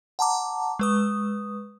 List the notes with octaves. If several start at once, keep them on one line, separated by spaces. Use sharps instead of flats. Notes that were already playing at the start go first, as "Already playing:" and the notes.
F#5 A5 A#5 D6
G#3 B4 D#6